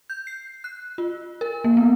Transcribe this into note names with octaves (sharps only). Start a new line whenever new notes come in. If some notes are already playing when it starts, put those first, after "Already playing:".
G6
C7
F#6
F4
A#4
A#3
B3